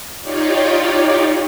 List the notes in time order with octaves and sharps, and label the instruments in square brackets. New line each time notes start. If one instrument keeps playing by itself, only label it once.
[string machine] D#4 F4 G4 C#5 D5